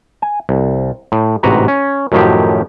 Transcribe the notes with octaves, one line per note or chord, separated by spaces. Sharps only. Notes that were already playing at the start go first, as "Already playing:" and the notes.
G#5
C2
A2
A1 G#2 C3 F#4 B4 A#5
C#4
F#2 A2 D#3 F3 F#3 G4